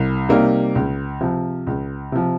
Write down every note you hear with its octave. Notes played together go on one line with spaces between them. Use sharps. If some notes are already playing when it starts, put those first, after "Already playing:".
Already playing: C2
C3 G3 A#3 D#4
C#2
C3 F3
C#2
C3 F3